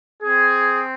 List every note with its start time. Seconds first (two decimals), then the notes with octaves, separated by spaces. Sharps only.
0.23 C4 G#4